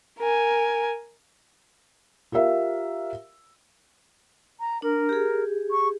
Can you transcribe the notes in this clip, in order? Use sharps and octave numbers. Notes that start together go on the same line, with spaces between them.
A#4 G#5
F4 G4 A#4 E5 F5
A#5
D4 A#4
G4 G#4
C#6